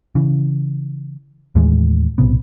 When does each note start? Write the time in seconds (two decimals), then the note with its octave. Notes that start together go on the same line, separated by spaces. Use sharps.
0.15 C#3 E3
1.55 D#2 A2 E3 G#3
2.18 B1 A2 C3 B3